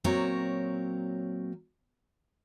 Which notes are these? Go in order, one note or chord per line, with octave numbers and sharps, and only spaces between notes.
A#2 F#3 C4 A#4 C#5